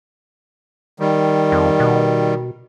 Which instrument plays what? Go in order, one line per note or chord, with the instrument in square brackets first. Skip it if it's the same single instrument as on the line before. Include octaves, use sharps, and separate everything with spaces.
[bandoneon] D#3 G3
[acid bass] F2
B2